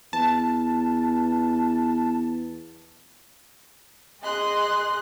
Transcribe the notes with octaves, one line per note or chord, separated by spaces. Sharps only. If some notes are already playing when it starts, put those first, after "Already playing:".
E2 A5
G#4 D#5 C6 F#6